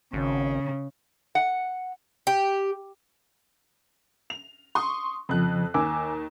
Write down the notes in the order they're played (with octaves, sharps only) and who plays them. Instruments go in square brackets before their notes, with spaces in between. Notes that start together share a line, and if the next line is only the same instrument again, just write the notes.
[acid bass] G#1 [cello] C#3
[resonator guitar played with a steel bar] F#5
[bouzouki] G4
[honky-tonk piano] F7
C6 C#6 D#6
[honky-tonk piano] F2 F#6 [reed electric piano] C#3 F3
[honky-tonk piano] D#2 [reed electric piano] G#5 D6 E6